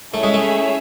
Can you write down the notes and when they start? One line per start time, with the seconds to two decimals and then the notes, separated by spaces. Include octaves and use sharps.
0.13 A3 C#4 E4 G#4 C#5 E5
0.23 G#3
0.34 A3